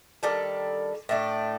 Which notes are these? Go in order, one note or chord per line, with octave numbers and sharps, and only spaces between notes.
D#3 G3 D4 A4
A2 A3 D4